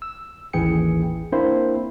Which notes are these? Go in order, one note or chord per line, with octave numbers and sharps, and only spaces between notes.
E6
A1 D#2 E3 G#4 G5 C#7
A#3 C4 D4 E4 A#4 C5